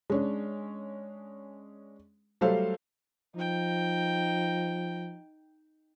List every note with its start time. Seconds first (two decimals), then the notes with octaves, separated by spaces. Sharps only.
0.10 G#3 C#4 D4
2.41 F#3 G3 A3 A4 C5 F5
3.36 F3 D#4 G5